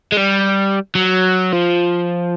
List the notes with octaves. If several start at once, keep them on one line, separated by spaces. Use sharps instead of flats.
G#3
G3
F#3
F3